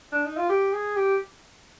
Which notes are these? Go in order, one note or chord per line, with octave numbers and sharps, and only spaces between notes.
D4
D#4
F4
G4
G#4
G4